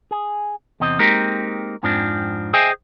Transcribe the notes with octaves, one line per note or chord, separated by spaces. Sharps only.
G#4
E2 C3 C4 D#5
G#3 A#3 C4 D#4 G4 A#4
F2 G#2 F3 C4 D4
G#4 C5 D#5 E5 G5 G#5